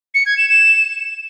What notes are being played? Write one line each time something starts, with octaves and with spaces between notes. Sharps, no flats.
C#7
G#6
E7
E7